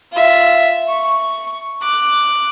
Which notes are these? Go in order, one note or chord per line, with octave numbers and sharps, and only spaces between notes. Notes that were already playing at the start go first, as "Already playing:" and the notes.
F4 E5
C#6
D6 F#6